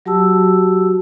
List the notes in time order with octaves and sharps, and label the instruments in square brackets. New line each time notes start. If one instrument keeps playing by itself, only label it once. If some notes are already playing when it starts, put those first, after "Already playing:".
[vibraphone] F#3 F#4 G4 A5 E6